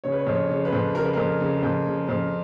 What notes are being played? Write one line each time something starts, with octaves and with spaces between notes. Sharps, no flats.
C#3 C#5
B4
C#5
F2
C#5
C#3
B4
F2
C#3 A#4
B4
F2 A#4
C#3
F2
C#3
F2